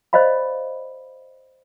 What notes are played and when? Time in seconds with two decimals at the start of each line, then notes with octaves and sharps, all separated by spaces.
0.13 C5 D5 D#5 F5 B5